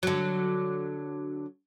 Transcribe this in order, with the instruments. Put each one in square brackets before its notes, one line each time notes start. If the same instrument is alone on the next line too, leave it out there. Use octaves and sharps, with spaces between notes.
[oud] D3 F#3